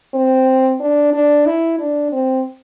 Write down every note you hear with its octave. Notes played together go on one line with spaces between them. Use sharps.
C4
D4
D4
E4
D4
C4